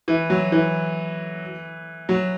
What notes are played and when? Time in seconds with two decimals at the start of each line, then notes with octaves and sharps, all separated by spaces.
0.08 E3
0.30 F#3
0.52 E3
2.09 F#3